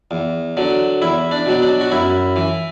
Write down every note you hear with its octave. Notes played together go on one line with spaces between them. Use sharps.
E2
D3 F#3
E2 E4
D4
B2 F#3
D4
F#4
F#2 E4
E3